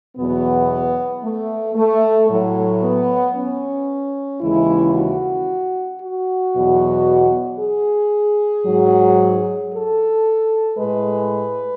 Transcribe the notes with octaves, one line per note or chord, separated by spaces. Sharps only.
E2 B2 F#3 B3
A3
A3
A2 F#3
B3
C#4
D#2 C#3 E3 G#3 E4
F#4
F#4
E2 B2 F#3
G#4
G#2 F#3
A4
A2 G#3 B4